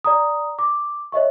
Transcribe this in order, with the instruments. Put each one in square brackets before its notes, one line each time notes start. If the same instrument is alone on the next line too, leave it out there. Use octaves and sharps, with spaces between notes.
[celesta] D5 A#5 D#6
D6
C#5 D#5 E5 C#6